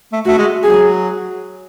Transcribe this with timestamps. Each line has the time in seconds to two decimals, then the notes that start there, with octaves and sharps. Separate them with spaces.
0.12 A3
0.25 A3 F#4
0.38 G#3
0.63 F#3 G#4